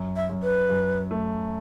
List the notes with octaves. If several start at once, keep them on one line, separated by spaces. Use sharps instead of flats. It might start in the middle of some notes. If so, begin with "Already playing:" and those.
Already playing: F#2
E5
F#2
B4
F#2
A3